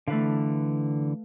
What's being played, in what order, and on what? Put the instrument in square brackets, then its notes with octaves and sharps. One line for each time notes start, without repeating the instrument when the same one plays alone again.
[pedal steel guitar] D3 E3 [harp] A3 B4 F5